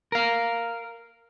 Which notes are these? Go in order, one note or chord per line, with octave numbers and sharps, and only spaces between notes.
A#4 F5